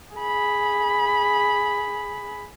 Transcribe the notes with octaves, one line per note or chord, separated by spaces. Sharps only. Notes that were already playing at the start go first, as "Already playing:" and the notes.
G#4 B5